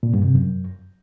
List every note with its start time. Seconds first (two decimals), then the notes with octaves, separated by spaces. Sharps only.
0.03 A#2
0.14 G2
0.24 C3
0.35 F#2